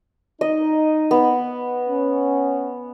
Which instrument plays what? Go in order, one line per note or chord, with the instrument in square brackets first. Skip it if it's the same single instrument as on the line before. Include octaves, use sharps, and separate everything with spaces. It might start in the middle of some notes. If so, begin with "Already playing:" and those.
[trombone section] D#4 [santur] D#5
[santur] B3
[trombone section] C#4